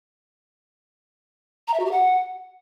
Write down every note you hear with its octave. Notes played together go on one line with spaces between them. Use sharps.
A#5
E5
F#4
G4
F#5